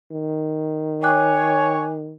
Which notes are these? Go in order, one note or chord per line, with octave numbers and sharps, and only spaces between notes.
D#3
C#5 G5 G#5 D6 F#6